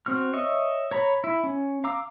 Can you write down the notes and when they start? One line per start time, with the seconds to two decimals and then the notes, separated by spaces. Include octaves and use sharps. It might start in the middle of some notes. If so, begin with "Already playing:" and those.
0.06 C4 F#4 F6
0.33 C#5 D#5 E5
0.91 C#5 A#5 B5
1.24 E4
1.44 C#4
1.84 F5 A#5 D6 E6